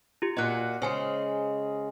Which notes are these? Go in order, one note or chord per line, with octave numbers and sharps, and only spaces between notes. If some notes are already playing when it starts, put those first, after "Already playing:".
F4 G4
A#2 F#4 D#5 F#6
C#3 G#3 C5 G#5